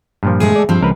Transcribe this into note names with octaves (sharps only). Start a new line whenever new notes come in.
G2 A#2 F3
G#3 A3 G#4
A4 D5
G2 F3 C4
C#2 A#4 B4